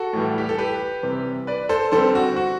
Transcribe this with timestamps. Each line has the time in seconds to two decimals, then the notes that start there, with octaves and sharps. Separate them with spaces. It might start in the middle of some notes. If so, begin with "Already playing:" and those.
Already playing: F#4 A4
0.13 A2 E3 G3
0.38 G4
0.49 A4
0.58 G4 B4
1.03 C3 E3 G3 C4
1.47 B4 D5
1.69 A4 C5
1.92 D3 G3 C4 A4 C5
2.15 F#4
2.36 F#4